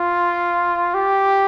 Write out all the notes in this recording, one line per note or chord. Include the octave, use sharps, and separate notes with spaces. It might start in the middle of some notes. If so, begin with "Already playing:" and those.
Already playing: F4
G4